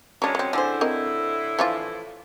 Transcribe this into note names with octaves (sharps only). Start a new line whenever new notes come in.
A2 F#3 G#3 C#4 D4
F#3 C4
A2 D3 E4 G#4 C5
C4 A#4 D#5
E3 F3 F4